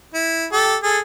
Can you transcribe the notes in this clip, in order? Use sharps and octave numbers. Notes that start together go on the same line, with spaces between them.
E4
G4 A4
G#4 A4